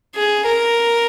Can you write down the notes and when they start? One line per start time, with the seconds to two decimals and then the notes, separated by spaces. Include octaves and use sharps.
0.16 G#4
0.46 A#4